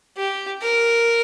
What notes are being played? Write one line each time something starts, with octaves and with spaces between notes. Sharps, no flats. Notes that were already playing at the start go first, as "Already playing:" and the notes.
G4
A#4